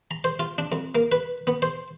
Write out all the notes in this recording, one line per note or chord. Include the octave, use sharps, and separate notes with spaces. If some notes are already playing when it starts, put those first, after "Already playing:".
A#5
C5
F4
D4
F2
A#3
B4
B3
C5